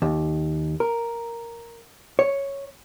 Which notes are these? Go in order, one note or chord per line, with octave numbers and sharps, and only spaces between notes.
D#2
A#4
C#5